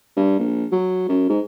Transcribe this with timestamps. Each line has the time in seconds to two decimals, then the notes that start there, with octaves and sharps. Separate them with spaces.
0.17 G2
0.39 A#1
0.72 F#3
1.09 F#2
1.29 G#2